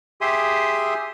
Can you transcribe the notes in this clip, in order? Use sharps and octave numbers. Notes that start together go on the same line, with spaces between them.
G4 G#4 E5 C6 D#6